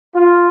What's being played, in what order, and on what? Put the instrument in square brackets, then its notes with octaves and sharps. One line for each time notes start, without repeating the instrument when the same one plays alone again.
[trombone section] F4